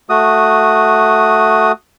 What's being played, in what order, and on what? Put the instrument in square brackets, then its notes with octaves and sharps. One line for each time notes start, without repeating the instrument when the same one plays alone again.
[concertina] A3 F#4 D#6